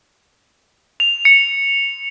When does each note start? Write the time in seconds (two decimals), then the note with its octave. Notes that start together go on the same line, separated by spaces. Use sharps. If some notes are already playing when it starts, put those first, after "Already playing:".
1.00 F7
1.25 C#7